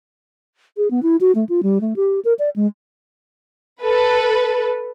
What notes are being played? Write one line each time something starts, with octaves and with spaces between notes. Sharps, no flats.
G#4
B3
E4
F#4
A3
F4
G3
A3
G4
A#4
D5
G#3
A4 B4